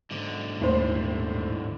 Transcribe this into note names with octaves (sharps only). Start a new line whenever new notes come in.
G#2 D3
D#1 A2 C5